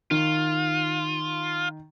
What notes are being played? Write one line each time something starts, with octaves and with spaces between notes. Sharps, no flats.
D#3 F4